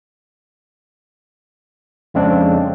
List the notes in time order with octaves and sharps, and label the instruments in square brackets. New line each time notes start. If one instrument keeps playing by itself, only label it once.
[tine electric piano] F2 C#3 G#3 C4 D4